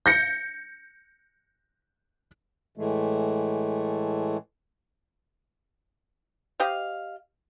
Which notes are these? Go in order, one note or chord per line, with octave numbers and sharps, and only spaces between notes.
G6 A#6 C#7
A2 E3 G#3 A3
G4 C5 D#5 F5